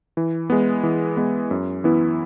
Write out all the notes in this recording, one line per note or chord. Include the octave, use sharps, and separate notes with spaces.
E3
G#3 B3
E3
G#3 B3
F#2
E3 B3 E4